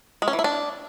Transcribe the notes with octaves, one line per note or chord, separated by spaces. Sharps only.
G#3
C#4
E3
E4
D4